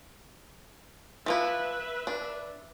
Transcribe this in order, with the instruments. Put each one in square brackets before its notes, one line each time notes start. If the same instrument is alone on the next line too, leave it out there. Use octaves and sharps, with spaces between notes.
[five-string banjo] E3 F3 E4 [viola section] B4 E5
[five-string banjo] D4